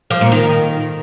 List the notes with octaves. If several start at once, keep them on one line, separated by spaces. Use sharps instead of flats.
F3
A#2
D#3